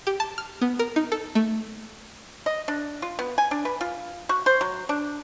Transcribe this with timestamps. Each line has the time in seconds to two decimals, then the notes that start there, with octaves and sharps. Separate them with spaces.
0.07 G4
0.20 A5
0.38 F6
0.62 B3
0.79 A#4
0.96 D#4
1.12 A4
1.35 A3
2.46 D#5
2.68 D4
3.02 F4
3.19 B3
3.38 G#5
3.51 D4
3.65 B4
3.81 F4
4.29 F#4
4.46 C5
4.61 F#3
4.89 D4